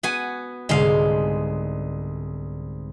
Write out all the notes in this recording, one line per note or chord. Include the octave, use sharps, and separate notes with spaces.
B3 F#4 G#5 C#7 D#7
C2 G#2 D3 G#3 F5